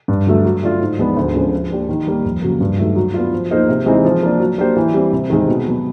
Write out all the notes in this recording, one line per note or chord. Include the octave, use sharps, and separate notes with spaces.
G2
D3 F#3 A3
F#3
A3 D4 F4
G#2
F3 G#3 B3 D4
D2
D3 F3 G#3 C#4
F3
A#3 D4 G4
D#3
G3 A#3 D#4 G4
F2
C#3 F#3 A#3
G2
D#3 F#3 A3
F#3
B3 D4 F4
F3
A#3 D#4 G#4 C5
C3
E3 G#3 C4 D#4
F3
A#3 D4
F#3
A#3 D4 G4 C5
E3
G3 C4
C3
D#3 G#3 C4
B2
F#3 B3